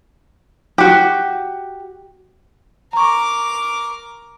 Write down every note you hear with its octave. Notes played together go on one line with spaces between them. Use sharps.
F#4 G4
A#4 A#5 C#6 D6